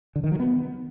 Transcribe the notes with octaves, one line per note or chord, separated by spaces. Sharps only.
D3
D#3
F#3
B3